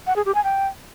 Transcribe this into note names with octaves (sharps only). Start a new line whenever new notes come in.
F#5
G#4
G4
G#5
G5